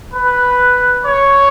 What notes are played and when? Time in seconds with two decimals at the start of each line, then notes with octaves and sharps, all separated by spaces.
0.14 B4
1.06 C#5